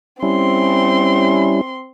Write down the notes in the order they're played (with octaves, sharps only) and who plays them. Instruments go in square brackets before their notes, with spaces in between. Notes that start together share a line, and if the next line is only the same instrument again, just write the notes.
[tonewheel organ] G3 C#4 E4 [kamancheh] C4 C6